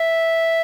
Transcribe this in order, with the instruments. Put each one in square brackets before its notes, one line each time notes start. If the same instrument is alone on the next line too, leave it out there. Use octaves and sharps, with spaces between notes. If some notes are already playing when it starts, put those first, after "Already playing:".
Already playing: [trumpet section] E5